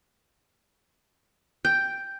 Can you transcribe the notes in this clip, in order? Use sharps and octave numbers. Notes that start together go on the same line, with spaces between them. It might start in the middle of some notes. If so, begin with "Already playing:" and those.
G5